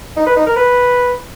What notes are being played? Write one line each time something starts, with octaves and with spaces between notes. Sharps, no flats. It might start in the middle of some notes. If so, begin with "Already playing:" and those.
D#4
B4
D#4
A#4
B4